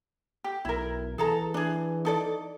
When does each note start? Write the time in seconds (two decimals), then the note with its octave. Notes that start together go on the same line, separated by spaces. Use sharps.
0.44 G4
0.65 B1 E4 A#4
1.18 E3 G#4 A4 A#5
1.54 E3 D4 G#4
2.05 D#4 A4 D5